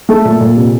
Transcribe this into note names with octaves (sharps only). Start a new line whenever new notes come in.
A3 A4
A#2
A#2
C3